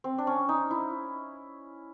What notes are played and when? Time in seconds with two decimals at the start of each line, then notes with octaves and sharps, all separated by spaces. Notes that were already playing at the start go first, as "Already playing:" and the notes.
0.04 C4
0.18 D4
0.27 C#4
0.49 D#4
0.71 E4